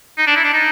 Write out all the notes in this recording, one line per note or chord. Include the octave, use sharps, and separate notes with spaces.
D#4
D4
E4
D4
D#4